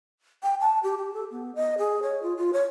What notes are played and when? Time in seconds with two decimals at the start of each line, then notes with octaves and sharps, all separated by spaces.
0.43 G5
0.61 A5
0.83 G4
0.97 G4
1.14 A4
1.31 B3
1.55 D#5
1.78 G#4
2.03 C#5
2.23 F4
2.37 F4
2.53 C#5